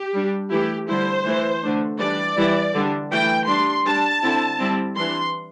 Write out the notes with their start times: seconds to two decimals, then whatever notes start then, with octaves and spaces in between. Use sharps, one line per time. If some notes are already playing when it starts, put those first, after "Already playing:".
Already playing: G4
0.14 G3 D4
0.50 E3 A3 E4 G4
0.88 D3 G3 E4 C5
1.25 E3 A3 E4
1.62 D3 A3 D4
1.99 E3 G3 D4 D5
2.36 E3 G3 E4
2.74 D3 G3 D4
3.10 E3 A3 E4 G5
3.48 G3 D4 C6
3.86 G3 D4 A5
4.23 D3 C4 E4
4.59 G3 C4 E4
4.96 E3 G3 D4 C6